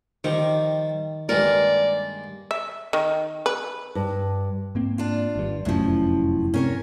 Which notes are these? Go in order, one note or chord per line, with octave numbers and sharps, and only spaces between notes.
D#3 F3 G3
G2 G#3 A#3 A#4 D5
E5
D#3
B4
G2
G#2 A#3 C4
D4 F4
G#1 G2
F1 F#2 A2 F3 C#4
G2 C3 C4 C#4 A#4 C#5